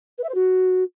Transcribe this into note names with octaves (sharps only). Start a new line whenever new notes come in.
B4
E5
C5
F#4